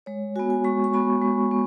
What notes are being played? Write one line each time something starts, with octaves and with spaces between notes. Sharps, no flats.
G#3 C#5
B3 F#4 G#5
G#5
G#3 C#6
C#6
B3 F#4 B5
G#3
B3